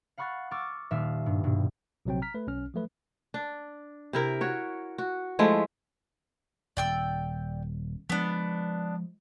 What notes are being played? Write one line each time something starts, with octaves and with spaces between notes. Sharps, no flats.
F5 F#5 B5 C#6 F#6 A6
C#6 D6 E6 F6 A6
D#1 E5 F5
G2
G2 B2
A#1 C3 F#3 C4 G5
A#5 F6 B6
A3 B4
B1 C#4 F6
F3 F#3 A3 B4
D4
C3 E4 A#4
F#4 C#5
F#4
F3 G#3 A3 E4
D#1 D5 G5 E6
F3 G#3 B3 D4